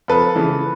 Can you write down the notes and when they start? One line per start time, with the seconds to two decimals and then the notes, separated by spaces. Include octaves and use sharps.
0.08 F2 A4 B4
0.35 C#3 E3